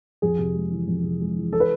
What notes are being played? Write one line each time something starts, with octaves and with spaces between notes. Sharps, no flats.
F2 G#4
C3
G#3
E3
F2
C3
G#3
E3
A4
B4